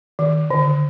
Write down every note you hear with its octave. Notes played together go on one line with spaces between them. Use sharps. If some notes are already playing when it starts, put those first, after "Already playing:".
D#3
D3